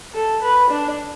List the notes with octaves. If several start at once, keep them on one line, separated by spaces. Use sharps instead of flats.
A4
B4
D4